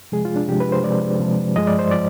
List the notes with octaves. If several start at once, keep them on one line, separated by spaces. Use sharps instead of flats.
C3 F3 G#3 G#4
F4
D4
C3 F3 G#3 G4
B4
C5
C3 F3 G#3 D5
C3 F3 G#3
G2 F3 G#3 D#5
D5
C5
F3 G#3 D5